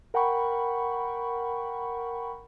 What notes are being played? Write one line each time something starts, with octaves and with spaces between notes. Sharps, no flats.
A#4 F#5 G5 B5 C#6